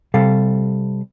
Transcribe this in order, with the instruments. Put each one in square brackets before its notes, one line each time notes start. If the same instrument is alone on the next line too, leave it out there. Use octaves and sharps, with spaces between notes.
[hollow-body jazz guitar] C3 G3 A4 F5